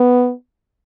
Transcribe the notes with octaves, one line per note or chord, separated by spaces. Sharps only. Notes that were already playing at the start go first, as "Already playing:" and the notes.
Already playing: B3